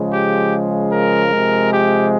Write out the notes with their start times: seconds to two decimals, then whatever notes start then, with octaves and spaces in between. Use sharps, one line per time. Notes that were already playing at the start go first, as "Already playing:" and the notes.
Already playing: C#3 F3 G#3
0.13 G4
0.92 A#4
1.32 C3 F3 G#3
1.72 G4